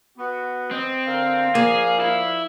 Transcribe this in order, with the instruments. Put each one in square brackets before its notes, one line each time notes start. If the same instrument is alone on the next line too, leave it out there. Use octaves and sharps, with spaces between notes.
[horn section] B3 F#4
[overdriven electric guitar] C4 [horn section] D#5
[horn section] D3 A#4 [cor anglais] F5
[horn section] F3 D5 [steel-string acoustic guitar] A#3 [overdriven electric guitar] G#4
[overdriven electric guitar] E4